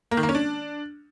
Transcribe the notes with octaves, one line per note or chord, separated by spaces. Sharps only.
A#3
D#3
A#3
C#4
D4